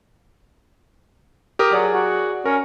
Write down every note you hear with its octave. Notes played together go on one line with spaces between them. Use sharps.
G4 A#4 D#6
F#3 G#4 D5
F#4
C#4 A#4